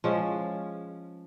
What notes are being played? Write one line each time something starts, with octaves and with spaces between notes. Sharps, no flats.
F3 G#3 C#4